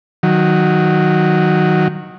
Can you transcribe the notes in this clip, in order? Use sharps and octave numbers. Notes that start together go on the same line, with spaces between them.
D#3 F#3